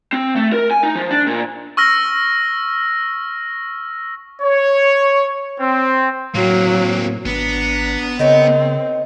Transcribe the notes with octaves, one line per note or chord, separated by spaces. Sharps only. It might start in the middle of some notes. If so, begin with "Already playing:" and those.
C4
A3
A#4
G#5
D#4
F3
D4
A#2
C#6 E6 F6 A#6
C#5
C4
A2 F#3 A#3 C4
G#1 B3 D4 A#5
C#3 C4 D#4 A#4 C#5